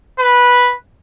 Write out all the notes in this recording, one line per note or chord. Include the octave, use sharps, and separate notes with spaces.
B4